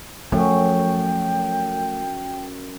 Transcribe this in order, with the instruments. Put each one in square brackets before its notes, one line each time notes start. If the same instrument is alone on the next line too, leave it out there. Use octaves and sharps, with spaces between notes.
[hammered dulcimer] F#2 [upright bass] F3 [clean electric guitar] A3 [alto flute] G5